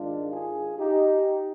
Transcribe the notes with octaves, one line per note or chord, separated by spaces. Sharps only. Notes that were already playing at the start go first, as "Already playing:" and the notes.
Already playing: G#2 D#3 G#3 D4 F4
F4 G#4
D#4 G4